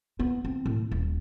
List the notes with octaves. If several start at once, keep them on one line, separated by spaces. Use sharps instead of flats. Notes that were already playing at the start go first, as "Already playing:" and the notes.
B3
C4
A2
D#1